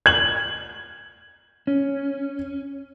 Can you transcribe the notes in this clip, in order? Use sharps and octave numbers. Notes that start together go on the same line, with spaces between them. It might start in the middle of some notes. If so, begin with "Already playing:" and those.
G#6 F#7
C#4